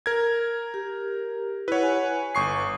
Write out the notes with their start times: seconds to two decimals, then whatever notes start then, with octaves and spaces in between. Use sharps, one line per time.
0.06 A#4 G#6
0.74 G4
1.68 E4 B4 C#5 F#5
1.83 G#5
2.35 G1 C#6 D#6 C7